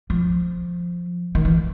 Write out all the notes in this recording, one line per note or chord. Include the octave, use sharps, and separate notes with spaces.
F3
D#3
E3